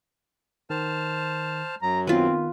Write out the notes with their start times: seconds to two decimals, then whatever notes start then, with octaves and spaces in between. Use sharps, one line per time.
0.70 D#3 C5 A5 F6
1.82 F#2 F#3 A#5
2.07 D#3 B3 C4 F4 B4